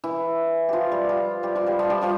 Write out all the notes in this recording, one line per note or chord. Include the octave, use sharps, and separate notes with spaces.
E3 E4
F3 F4 G4
G3 G4
F3 F4
G3 G4
F3 F4
G3 G4
F3 F4
G3 G4
F3 F4